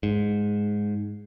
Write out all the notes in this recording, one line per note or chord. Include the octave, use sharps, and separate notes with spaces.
G#2